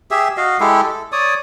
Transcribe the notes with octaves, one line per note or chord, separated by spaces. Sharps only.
G4 G#4 E5
F#4 D#5 F5
G#3 E4 G4 A4
A4
C#5 D5 D#6